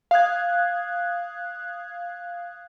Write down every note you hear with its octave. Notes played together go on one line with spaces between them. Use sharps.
F5 D#6 F#6 G#6